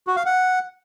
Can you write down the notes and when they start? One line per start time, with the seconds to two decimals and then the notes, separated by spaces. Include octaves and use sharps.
0.07 F#4
0.16 F5
0.26 F#5